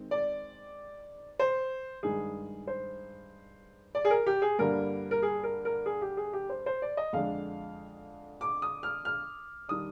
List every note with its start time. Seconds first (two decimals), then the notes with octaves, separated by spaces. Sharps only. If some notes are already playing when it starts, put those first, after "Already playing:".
Already playing: D#3 G#3 C4
0.11 D5
1.39 C5
2.03 G2 D#3 G#3 G#4
2.67 C5
3.95 D5
4.05 G#4
4.10 A#4
4.26 G4
4.42 G#4
4.59 G2 D3 G3 A#3 A#4
5.11 A#4
5.22 G#4
5.43 A#4
5.65 A#4
5.86 G#4
6.02 G4
6.17 G#4
6.33 G4
6.50 C5
6.66 C5
6.82 D5
6.97 D#5
7.13 F2 D3 G#3 D4 F5
8.41 D6
8.62 D#6
8.83 F6
9.05 F6
9.68 D#3 G3 D4 D#6